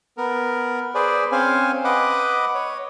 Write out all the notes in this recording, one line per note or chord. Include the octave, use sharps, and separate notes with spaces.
B3 A#4
G#4 B4 C5 D5
C4 C#4 C5 F5 G#5
B4 D#5 F#5 D6
C#5